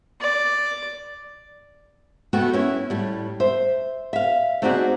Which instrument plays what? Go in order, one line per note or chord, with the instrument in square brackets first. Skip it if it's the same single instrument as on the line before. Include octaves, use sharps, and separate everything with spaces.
[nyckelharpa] D5
[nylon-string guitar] A3 B3 F#4 G5
C#4 E4 B4
A2 G3
C5 E5
E5 F5
A3 C4 D#4 F#4 G#4 D5